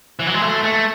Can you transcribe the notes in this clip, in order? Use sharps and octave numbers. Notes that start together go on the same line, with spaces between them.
E3
F#3
G#3
A3
A3